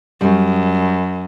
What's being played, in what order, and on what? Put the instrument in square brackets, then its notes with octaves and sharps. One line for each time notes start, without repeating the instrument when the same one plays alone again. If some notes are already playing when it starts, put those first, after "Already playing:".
[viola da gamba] F#2 [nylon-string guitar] G3